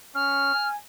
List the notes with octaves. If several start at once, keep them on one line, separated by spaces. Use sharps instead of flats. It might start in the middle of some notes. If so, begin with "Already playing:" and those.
C#4 F6
G#5